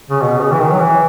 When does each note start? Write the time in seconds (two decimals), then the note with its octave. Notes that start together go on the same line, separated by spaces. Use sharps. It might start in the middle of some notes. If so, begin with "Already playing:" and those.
0.10 C#3
0.21 B2
0.41 C#3
0.52 E3
0.61 D#3
0.72 F#3
0.80 E3